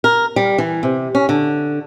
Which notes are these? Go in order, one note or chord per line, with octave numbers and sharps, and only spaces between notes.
A#4
G3
E3
C3
C#4
D3